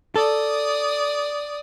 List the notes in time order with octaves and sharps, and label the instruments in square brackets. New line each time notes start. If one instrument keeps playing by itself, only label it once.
[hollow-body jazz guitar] A4 [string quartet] D5 D#6